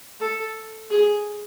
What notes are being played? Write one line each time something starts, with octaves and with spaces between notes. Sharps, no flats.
A4
G#4